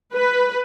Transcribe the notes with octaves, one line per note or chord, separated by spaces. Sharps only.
B4